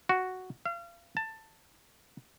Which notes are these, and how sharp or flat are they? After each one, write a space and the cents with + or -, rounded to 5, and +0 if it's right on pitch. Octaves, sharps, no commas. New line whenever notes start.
F#4 +0
F5 -35
A5 +15